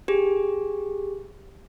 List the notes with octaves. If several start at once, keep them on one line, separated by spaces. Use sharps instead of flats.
G4 G#4